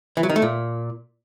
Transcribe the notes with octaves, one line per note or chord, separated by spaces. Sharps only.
E3
F#3
D#3
A3
A#2